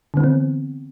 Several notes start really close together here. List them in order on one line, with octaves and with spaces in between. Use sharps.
D3 B3 E3 C4